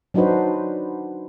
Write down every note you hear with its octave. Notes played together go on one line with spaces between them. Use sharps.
F#3 D4 D#4 F#4 B4 C5